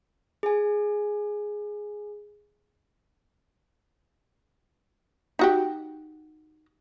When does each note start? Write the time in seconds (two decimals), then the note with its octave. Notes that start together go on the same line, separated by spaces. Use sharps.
0.43 G#4 G#5
5.39 D#4 F#4 G4